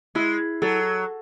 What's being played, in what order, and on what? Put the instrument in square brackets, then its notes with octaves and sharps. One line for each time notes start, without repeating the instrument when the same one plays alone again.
[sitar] G#3 [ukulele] E4
[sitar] F#3 [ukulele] A4